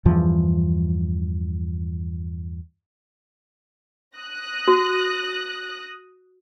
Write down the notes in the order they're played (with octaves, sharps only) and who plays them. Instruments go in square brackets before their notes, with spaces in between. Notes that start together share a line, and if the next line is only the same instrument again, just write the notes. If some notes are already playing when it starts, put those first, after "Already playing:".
[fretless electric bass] E2 G2 E3 F3
[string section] D#6 F#6 A#6
[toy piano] F#4